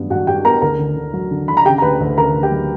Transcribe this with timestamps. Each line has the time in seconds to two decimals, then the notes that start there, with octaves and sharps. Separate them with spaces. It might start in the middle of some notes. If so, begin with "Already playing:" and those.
Already playing: G2 F#3 B3
0.10 G2 F#4 F#5
0.27 G2 G4 G5
0.45 B3 A#4 A#5
0.61 D2 A#4 A#5
0.79 D3
0.96 D3
1.13 F#3
1.31 D3
1.48 D3 B5
1.57 A#5
1.65 C#3 G4 G5
1.78 A#5
1.82 D2 B4 B5
2.00 D2
2.17 C#3 A#4 A#5
2.34 D2
2.43 G4 G5
2.52 F#3